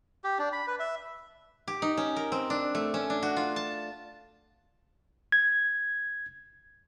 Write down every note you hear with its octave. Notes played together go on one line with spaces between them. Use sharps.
G4
D4
B5
B4
E5
G4
D#4
C#4
A#4
C4
D4
A3
C#4
D4
F#4
F4
A5
G#6